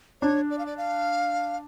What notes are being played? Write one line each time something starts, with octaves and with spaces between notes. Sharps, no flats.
D4 C#5
D5
F5
D5
F5